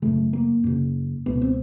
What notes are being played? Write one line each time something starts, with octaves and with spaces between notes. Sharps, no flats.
F#2 C#3 A3
A#3
F#2 C#3
C#2 B2 B3
C4